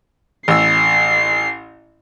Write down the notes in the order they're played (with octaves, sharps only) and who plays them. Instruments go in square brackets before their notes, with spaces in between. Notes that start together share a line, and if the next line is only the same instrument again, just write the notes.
[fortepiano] A1 E6 [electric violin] C7